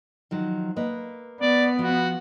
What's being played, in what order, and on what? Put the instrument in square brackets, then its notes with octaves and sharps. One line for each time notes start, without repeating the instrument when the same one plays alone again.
[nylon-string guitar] D#3 F3 F#3
A#3 B4 D#5
[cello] B3 [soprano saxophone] D5
[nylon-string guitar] F3 [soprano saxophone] F#4